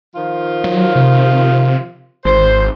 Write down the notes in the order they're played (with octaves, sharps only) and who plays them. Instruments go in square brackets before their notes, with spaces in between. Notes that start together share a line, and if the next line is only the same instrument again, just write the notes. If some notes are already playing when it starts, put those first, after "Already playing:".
[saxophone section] D#3 F3 F4
[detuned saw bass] F#3
C3
[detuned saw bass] G#1 [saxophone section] C5